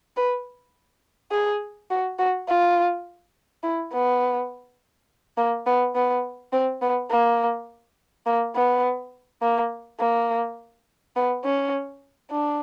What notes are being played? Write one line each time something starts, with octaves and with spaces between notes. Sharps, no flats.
B4
G#4
F#4
F#4
F4
E4
B3
A#3
B3
B3
C4
B3
A#3
A#3
B3
A#3
A#3
B3
C#4
D4